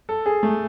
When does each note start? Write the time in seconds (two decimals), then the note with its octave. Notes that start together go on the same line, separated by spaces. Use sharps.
0.09 A4
0.26 G#4
0.43 A3